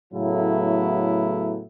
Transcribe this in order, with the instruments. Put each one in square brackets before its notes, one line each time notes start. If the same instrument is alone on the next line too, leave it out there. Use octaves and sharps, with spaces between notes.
[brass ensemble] A2 C#3 F#3 A3 B3 E4